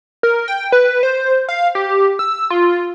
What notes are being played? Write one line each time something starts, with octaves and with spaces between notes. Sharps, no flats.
A#4
G5
B4
C5
F5
G4
E6
F4